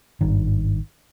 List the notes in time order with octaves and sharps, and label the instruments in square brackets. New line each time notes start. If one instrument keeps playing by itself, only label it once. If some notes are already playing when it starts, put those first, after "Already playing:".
[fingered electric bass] G#1 G2 D#3